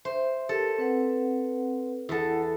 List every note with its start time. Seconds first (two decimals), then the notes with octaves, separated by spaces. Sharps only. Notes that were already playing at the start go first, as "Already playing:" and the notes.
0.05 C5 E5
0.49 G4 A4 A#4
0.78 C4 B4 F#5
2.09 E2 E4 A4 F#5